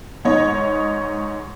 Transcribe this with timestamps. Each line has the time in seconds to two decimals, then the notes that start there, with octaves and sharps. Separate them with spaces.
0.25 G#2 D#4 C#5 D#5